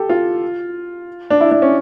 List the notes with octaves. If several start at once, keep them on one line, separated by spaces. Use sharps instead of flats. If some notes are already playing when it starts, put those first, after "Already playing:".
Already playing: G4 A4
F4
D4
E4
D4
C#4